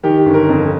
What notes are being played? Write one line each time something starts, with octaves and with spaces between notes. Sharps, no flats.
D#3 G4
G1
A#4
F2